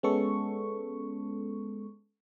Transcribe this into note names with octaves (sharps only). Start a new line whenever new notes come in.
G#3 B3 C#4 A4 C#6